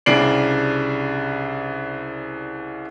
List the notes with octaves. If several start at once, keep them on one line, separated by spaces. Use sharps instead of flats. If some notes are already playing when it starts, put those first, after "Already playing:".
C2 C#3 D4 C7 D7 F#7